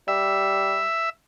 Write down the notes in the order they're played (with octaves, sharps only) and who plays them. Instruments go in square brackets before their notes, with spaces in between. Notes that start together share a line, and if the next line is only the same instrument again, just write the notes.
[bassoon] G3 [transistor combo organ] E5